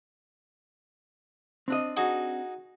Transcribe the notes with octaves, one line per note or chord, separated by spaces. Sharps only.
C4 D4 D#5
D#4 F#4 G#4